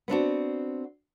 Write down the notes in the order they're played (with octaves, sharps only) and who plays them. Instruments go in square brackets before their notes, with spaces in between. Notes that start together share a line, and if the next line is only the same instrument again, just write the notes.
[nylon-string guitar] B3 C4 D4 F#4